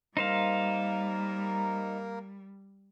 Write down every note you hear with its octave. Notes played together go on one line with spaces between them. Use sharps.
G3 A#3 D#4 A#4 C5 F5